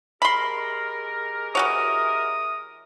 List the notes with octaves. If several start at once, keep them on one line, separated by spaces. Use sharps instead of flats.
G#3 G4 A#4 B5 C6
E3 F#4 C#5 D#6